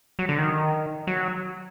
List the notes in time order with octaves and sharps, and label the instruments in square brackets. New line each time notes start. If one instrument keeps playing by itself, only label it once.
[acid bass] F#3
D3
D#3
F#3